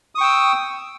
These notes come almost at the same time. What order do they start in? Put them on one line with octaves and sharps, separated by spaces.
D#6 C#6 G5 E6